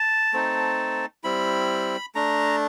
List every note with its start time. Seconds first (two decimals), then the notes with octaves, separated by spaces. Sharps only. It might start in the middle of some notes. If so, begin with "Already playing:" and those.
Already playing: A5
0.33 A3 C4 D#4
1.24 G3 C4 E4 B5
2.15 A3 D4 A#5